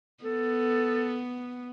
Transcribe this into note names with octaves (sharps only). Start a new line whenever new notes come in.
B3 A4